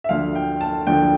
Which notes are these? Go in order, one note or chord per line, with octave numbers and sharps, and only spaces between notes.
E5
D2 D3 F3 F5
G5
A5
D2 D3 F3 G5